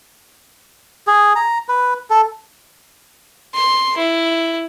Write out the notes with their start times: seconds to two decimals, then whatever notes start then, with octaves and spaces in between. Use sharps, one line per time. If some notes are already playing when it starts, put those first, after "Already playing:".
1.07 G#4
1.36 A#5
1.69 B4
2.10 A4
3.54 C6
3.97 E4